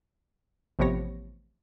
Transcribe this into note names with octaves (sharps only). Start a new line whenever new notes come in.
A1 C3 F3 B3 C#5 A#6